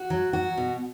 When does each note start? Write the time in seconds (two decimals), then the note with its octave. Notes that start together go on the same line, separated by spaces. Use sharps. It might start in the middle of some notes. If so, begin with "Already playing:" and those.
Already playing: F#4
0.10 F#3
0.33 F#4
0.57 B2